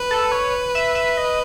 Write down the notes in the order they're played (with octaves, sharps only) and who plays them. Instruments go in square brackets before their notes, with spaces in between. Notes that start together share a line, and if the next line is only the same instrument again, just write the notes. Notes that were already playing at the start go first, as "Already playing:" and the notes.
Already playing: [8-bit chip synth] B4
[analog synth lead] A4
C#5
E5
E5
D#5